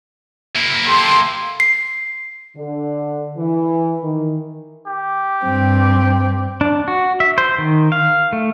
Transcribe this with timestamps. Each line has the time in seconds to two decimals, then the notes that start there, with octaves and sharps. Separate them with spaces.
0.55 A#3 E4
0.87 G4 A4 C6
1.60 C7
2.56 D3
3.38 E3
4.03 D#3
4.87 G4
5.43 G2 C4
6.61 D4
6.88 F#4
7.20 E5
7.38 C5
7.58 D#3
7.92 F5
8.33 A3